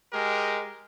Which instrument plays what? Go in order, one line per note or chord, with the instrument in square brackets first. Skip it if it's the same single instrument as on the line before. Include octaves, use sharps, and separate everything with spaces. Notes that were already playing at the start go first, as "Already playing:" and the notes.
[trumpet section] G#3 G4 A#4